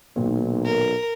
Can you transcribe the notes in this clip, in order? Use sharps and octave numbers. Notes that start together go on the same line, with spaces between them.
B1 A#2 D#3
A#4